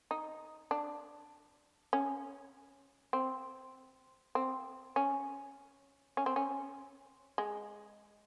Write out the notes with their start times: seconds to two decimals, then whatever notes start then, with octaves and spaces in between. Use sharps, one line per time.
0.11 D#4
0.71 D4
1.93 C#4
3.13 C4
4.35 C4
4.96 C#4
6.17 C#4
6.26 C4
6.36 C#4
7.38 G#3